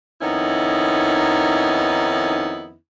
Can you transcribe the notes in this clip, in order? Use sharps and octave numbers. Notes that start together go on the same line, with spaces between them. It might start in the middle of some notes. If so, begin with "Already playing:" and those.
F2 D#3 B3 C#4 D#4 E4